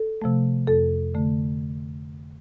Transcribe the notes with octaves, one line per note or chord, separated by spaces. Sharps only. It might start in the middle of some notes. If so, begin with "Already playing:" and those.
Already playing: A4
C3 F3 A3
F2 A4
D3 A3